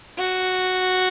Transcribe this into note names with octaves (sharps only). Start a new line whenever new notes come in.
F#4